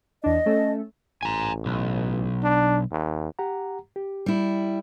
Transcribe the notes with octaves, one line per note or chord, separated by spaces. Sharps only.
E2 D4 D#5
A3 C#4 A4
A1 G#5 A#5
B1
D4
D#2
G4 F#5 A#5
G4
G3 E4